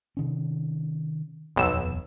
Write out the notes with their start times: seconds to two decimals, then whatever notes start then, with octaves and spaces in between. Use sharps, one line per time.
0.17 C3 D#3 C#4
1.56 D#1 B1 F2 E6